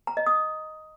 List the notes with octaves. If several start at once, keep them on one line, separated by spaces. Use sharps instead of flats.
A#5
D#5
D#6